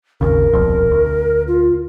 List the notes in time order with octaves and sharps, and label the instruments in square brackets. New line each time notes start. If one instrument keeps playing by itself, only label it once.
[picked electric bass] G#1 D#2 C#3 [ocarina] A#4
[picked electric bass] D#1 B1 F2
D2
[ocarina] F4